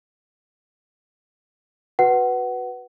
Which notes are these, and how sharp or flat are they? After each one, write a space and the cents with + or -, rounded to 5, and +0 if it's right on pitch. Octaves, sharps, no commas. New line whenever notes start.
F#4 -10 B4 +0 F#5 +20